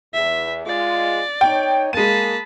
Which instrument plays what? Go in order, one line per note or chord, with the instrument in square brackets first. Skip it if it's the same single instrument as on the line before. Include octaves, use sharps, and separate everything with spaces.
[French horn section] E2 [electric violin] E5
[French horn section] G#3 F4 [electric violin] D5
[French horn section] D#4 C#5 [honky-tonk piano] G5
[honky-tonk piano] G#3 D#7 [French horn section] A#3 [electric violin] A5 B5